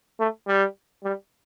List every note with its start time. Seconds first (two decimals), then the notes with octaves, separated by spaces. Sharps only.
0.20 A3
0.47 G3
1.04 G3